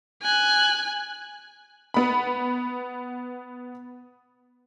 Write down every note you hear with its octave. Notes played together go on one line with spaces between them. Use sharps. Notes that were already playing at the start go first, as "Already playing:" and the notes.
G#5 F#6
B3 B5